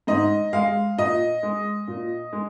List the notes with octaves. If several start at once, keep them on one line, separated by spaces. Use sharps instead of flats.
G#2 D#5
G#3 F5
A#2 D#5
G#3
A#2
G#3